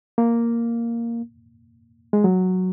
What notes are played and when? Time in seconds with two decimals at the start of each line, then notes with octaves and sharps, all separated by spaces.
0.18 A#3
2.13 G#3
2.24 F#3